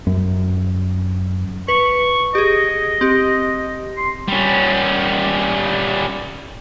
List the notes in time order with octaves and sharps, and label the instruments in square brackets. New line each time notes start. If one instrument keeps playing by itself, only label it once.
[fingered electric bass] F#2
[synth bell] B4 [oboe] C#6
[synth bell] G4 G#4 [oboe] D#5
[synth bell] C4 G4
[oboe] C6
[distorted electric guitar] G3 C#4